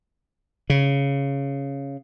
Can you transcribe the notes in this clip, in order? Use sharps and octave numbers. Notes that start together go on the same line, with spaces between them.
C#3